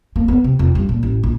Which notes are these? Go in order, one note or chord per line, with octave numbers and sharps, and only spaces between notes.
A#3
B3
C3
F2
G2
A#2
A1
A#1